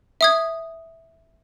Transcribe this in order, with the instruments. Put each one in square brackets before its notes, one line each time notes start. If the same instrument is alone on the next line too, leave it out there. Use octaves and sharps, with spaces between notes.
[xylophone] E5 D#6 G#6